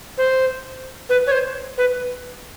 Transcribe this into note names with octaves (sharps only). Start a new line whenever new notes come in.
C5
B4
C#5
C5
B4